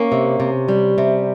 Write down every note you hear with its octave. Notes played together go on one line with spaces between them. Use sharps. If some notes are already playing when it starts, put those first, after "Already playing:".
Already playing: A#3 C#4
C3
C3
G3
C3